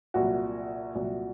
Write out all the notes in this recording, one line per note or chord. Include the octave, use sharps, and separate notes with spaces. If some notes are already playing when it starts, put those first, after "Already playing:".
C2 A#2 F#3 F#4
C2 A#2 F#3